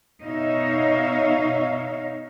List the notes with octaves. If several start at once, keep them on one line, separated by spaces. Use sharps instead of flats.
B2 D#4 C#5 E5 F5